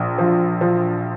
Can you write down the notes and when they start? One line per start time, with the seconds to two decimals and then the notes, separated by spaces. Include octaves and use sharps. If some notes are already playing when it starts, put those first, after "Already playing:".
Already playing: A#1
0.18 F3
0.61 F3